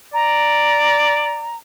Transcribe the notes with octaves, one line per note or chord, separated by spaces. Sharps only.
D5 A#5